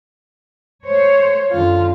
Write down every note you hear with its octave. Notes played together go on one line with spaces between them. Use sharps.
A3 C5 C#5
F#2 D3 F4